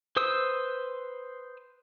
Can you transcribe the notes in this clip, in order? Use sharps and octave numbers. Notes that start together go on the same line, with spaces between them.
B4 C5 D#6 E6